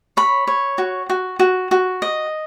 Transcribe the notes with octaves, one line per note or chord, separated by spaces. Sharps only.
C#5 B5
C#5
F#4
F#4
F#4
F#4
D#5